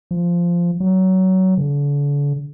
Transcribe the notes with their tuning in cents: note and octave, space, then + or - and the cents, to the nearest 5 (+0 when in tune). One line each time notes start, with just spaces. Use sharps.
F3 -10
F#3 +20
D3 -40